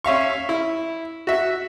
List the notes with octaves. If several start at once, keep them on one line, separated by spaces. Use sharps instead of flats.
C#4 E5 F5 C#6
E4
F#4 E5